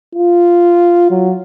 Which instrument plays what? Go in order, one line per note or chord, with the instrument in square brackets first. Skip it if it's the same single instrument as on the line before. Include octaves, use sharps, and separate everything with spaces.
[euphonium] F4
F#3